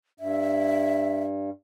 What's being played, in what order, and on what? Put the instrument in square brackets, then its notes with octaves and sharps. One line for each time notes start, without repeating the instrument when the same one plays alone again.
[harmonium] G2 [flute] E5